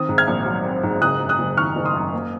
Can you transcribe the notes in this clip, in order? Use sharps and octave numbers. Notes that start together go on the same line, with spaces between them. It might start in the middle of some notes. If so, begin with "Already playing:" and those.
Already playing: D#3 C4 D#6
G#2
F6 G#6
A#1
F#3
C4
G#2
F#1 D#6 F#6
F#2
D#6 F#6
F#1
D#3 C#6 F6
F#1
C6 D#6
F#2
A#3